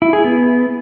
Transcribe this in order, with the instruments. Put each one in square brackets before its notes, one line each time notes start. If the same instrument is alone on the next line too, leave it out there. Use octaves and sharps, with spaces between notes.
[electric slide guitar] E4
G#4
B3